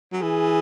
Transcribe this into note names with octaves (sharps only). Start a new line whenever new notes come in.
F#3
E3 G#4